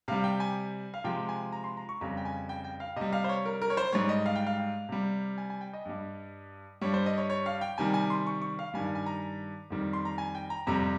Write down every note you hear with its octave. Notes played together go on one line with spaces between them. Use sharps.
C3 G3 F5
G5
G#5
F5
C3 F3 G#3 G5
G#5
A#5
C6
A#5
C#6
F2 C#3 G3 A#5
G5
G#5
G5
G5
F5
C3 G3 D#5
F5
C5
C#5
A#4
A#4
C#5
C5
G#2 G3 C#5
D#5
F5
G5
F5
C3 G3
G#5
G#5
G5
D#5
G2 G3
G2 G3 C#5
C5
D#5
C#5
C#5
F5
G5
C3 D#3 G3 G#5
G#5
C6
C#6
C#6
F5
G2 D#3 G3 G#5
G#5
A#5
F2 D#3 G3
C6
A#5
G#5
G5
A#5
F2 C3 G3 A#5